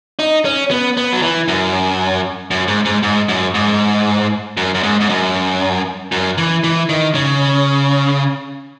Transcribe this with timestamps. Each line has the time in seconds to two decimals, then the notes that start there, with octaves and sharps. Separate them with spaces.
0.19 D#4
0.45 C#4
0.71 B3
0.97 B3
1.13 F#3
1.22 E3
1.48 F#2
2.51 F#2
2.68 G#2
2.85 G#2
3.03 G#2
3.29 F#2
3.54 G#2
4.57 F#2
4.74 F#2
4.83 G#2
5.00 G#2
5.09 F#2
6.12 F#2
6.38 E3
6.64 E3
6.89 D#3
7.15 C#3